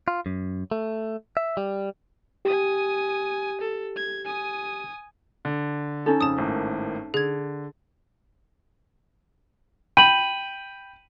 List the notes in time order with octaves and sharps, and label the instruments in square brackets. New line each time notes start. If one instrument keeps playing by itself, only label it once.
[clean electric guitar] F4
F#2
A3
E5
G3
[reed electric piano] G4 [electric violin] G#5 D#6
[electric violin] A4
G#6
G#5 D#6
[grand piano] D3
[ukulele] C#4 D#4 A4
[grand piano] F2 C#3 [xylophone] A5 D#6
[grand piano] G#1 A2 A#3
[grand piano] D3 [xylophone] G#4 G#6
[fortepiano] G5 B5 [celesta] D#7 F#7